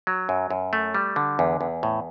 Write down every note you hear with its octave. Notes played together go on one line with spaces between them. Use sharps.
F#3
F#2
F#2
A3
G3
D3
E2
E2
A2